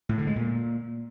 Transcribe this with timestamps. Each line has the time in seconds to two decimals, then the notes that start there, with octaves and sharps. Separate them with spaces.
0.09 A2
0.18 D3
0.27 G#3
0.36 A#2